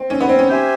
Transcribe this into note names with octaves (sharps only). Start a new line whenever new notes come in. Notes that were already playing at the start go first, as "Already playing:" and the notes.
Already playing: C4
C#4
B3
C4
C#4
G4 C5 E5 G#5